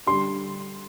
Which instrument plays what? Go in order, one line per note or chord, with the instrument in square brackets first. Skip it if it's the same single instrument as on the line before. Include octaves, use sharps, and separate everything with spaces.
[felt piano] D3 G3 D4 G4 [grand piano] C6